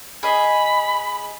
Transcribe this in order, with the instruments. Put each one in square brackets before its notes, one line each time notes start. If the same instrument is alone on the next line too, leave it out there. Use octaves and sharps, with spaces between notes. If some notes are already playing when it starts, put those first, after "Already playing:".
[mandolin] G#4 D#5 [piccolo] B5